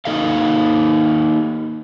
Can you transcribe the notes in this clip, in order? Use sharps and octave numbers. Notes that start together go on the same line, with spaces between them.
A#3 D#4 A4 D#5 F5